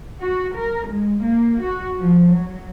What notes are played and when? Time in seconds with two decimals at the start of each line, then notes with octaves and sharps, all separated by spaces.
0.21 F#4
0.56 A#4
0.87 G#3
1.22 A#3
1.63 F#4
1.99 F3
2.33 F#3